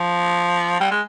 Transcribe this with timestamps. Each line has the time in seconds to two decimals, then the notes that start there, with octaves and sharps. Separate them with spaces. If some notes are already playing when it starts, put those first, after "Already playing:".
Already playing: F3
0.80 G3
0.91 G#3